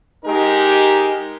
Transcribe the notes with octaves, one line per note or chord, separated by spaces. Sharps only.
G#3 D#4 G4 A#4